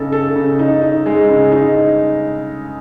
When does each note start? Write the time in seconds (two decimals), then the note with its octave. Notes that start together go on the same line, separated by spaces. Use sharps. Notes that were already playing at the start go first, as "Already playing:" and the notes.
Already playing: C#3 D#4 A4
0.12 A4
0.35 C#3
0.59 D#4
0.82 D#4
1.06 G#3
1.29 C#3
1.52 D#4